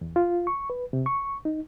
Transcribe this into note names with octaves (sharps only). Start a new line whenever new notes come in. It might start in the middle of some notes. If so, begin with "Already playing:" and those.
E2
F4
C#6
B4
C3
C#6
D#4